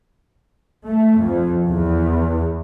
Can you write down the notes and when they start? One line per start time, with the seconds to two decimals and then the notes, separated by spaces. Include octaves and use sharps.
0.85 A3
1.19 F2
1.67 E2